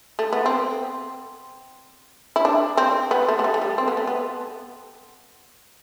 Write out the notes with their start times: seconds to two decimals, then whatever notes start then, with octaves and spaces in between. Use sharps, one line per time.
0.19 A3
0.33 B3
0.46 C4
2.36 E4
2.45 D4
2.77 C4
3.11 B3
3.28 A3
3.39 A3
3.44 G3
3.54 A3
3.62 G3
3.78 C4
3.88 B3
3.97 A3
4.07 B3